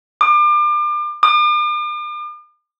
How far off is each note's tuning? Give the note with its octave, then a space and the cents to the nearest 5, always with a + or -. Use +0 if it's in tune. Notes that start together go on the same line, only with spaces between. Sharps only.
D6 +35
D6 +45